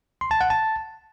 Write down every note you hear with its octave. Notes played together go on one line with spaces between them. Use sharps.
C6
A5
F#5
A5